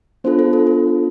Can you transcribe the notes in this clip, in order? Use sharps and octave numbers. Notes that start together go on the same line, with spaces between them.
B3 D4 F4 A4 C5
A4
A4
A4